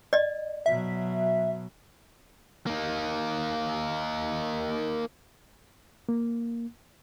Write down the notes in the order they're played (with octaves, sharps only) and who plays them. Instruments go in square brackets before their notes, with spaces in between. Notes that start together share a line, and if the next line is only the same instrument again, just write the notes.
[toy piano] D5 D#5
[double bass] B2 F#3 [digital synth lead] E5
[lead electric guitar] A#3 D#4
[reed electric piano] A#3